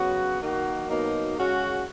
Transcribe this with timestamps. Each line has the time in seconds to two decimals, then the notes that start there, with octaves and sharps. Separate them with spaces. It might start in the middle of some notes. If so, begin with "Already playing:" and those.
Already playing: C#3 F#3 B3 F#4
0.40 D#3 A#3 D#4 F#4
0.88 B2 F#3 A#3 D#4
1.36 C#3 G#3 C#4 F#4